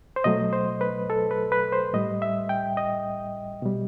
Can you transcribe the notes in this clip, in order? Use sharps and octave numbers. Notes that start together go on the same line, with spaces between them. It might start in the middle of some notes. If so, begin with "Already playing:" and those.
C5
B2 F#3 A3 D#5
C5
B4
A4
B4
B4
C5
A2 G3 D#5
E5
G5
D#5
B2 G3